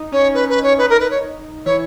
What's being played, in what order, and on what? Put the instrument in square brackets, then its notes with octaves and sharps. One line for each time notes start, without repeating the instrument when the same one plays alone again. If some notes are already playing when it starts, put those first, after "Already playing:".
Already playing: [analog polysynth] D#4
[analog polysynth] C#4 [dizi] C#5
[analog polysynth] D#4 [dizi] B4
[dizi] B4
C#5
[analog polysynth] D#4 [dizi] B4
[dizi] A#4
B4
C#5
[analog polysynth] E3 E4 [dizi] C#5